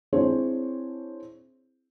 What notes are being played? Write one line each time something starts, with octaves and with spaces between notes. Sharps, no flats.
C4 D4 E4 G#4 C5 C#5